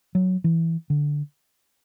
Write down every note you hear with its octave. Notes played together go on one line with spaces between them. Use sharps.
F#3
E3
D3